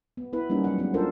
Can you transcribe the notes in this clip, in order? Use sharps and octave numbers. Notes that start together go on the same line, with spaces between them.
B3
B3 E4 B4
G3 A#3 C#4 D#4
F#3 F#5
G#3 B3
D4 F4 A4 A#4 C5